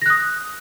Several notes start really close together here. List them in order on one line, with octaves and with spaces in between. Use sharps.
A#6 F#6 D#6